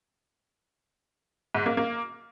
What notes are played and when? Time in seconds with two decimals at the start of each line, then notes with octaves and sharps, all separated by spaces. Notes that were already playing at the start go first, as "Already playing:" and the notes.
1.55 G#2
1.66 A#3
1.77 A#3